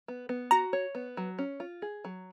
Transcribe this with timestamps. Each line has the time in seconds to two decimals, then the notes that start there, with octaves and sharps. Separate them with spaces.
0.08 B3
0.29 B3
0.51 F#4 A#5
0.73 C#5
0.95 B3
1.17 F#3
1.39 C#4
1.60 F4
1.82 G#4
2.05 F#3